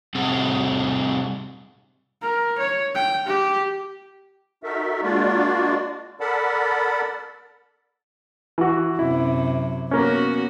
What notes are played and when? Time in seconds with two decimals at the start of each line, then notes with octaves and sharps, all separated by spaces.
0.15 C3 G3 A3 C4 G#4 F#5
2.22 A#4
2.59 C#5
2.95 G5
3.27 G4
4.63 D#4 F#4 A4 A#4 E5
5.03 G#3 A#3 D4 F4 F#4 D5
6.20 A4 A#4 D5 F#5 A5 B5
8.58 E3 F#4
8.99 F#2 C3 E4
9.91 A#3 B3 C#4 F#4